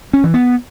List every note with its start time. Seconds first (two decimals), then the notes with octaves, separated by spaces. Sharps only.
0.13 C#4
0.24 E3
0.34 B3